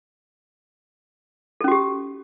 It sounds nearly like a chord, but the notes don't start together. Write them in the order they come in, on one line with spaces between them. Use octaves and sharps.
A4 C#4 F#4 G4